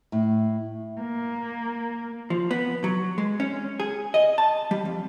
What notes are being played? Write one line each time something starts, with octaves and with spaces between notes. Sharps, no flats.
A2
A#3
F3
B3
F#3
G#3
C#4
G#4
D#5
A5
G3
F2